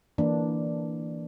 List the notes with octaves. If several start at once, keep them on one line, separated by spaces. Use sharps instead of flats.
E3 A#3 D4